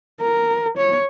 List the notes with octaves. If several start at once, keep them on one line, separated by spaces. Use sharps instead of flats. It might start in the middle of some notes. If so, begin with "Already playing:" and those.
A#4
C#5